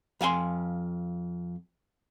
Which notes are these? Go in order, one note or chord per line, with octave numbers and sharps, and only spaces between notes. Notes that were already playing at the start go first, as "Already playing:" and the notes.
F2 F5 G#5 C6